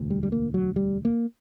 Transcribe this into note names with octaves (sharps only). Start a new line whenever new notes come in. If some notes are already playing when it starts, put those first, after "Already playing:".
Already playing: E1 D2 D3
G3
G3
A#3
F#3
G3
A#3